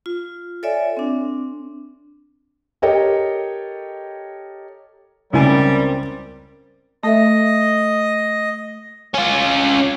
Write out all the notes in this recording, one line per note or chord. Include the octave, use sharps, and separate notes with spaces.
F4
A4 C#5 D5 E5 G#5
C4 D4
G4 A4 A#4 C#5 D#5 G5
C#2 G3 C4 E4 A#4 G#5
A3 A4 D#5 E5
C#4 F4